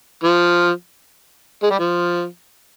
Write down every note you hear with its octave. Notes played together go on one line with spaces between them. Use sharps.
F3
G#3
G3
F3